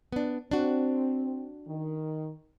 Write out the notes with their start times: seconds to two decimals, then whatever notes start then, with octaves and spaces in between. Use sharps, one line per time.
0.12 B3 D4
0.51 C4 D4 F#4
1.68 D#3